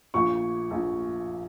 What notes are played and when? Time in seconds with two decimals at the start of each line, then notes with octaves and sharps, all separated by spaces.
0.14 A#1 A#2 F3 C#6
0.71 A#1 A#2 F3